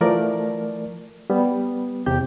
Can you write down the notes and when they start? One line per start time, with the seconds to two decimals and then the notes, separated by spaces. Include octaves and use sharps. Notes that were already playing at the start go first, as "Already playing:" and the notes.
0.01 E3 F3 A3 A#4 D5
1.30 G3 B3
2.06 E2 C3 G4 G6